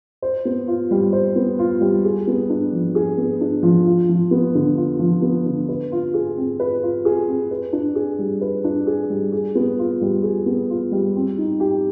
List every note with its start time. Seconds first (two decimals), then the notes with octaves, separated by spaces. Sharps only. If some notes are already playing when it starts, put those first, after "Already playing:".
0.22 C5
0.45 B3
0.67 F4
0.91 G3
1.13 C5
1.36 B3
1.59 F4
1.81 G3
2.05 G#4
2.27 B3
2.50 D4
2.73 F3
2.95 G#4
3.17 B3
3.41 D4
3.63 F3
3.86 F4
4.09 F3
4.31 B3
4.55 D3
4.77 F4
4.99 F3
5.22 B3
5.46 D3
5.69 B4
5.92 F4
6.14 G#4
6.37 C4
6.60 B4
6.83 F4
7.05 G#4
7.28 C4
7.51 B4
7.73 D4
7.95 G#4
8.19 G3
8.41 B4
8.64 D4
8.87 G#4
9.10 G3
9.32 G#4
9.55 B3
9.79 F4
10.02 G3
10.23 G#4
10.46 B3
10.70 F4
10.92 G3
11.15 C4
11.38 D#4
11.60 G4